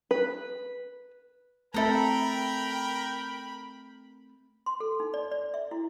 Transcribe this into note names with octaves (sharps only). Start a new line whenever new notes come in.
B4
A3 C4 A4 A#4 E5 G5 A#5 B5
C6
A4
D#4
D5
D5
E5
E4